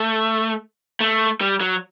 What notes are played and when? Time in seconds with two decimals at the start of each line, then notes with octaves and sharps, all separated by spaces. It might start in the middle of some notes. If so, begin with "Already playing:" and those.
Already playing: A3
1.00 A3
1.41 G3
1.61 F#3